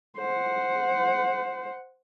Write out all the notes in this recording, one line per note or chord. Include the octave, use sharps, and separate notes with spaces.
C5 F#5